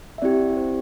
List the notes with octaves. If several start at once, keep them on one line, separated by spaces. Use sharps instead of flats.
E5
C4 E4 G4 D5
C5